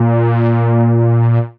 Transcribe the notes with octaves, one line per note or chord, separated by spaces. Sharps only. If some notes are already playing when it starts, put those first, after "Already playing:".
Already playing: A#2